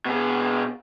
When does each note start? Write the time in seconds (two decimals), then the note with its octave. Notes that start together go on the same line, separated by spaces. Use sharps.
0.05 B2 G#4